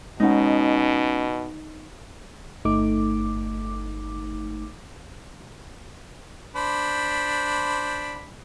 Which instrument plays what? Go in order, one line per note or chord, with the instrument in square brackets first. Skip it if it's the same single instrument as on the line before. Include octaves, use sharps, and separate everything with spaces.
[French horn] B2 [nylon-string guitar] G#3 C#4 F#5 [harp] D#4
[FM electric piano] G1 A3 D#4 D6
[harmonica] D4 C5 B5